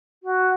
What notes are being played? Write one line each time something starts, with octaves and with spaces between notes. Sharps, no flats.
F#4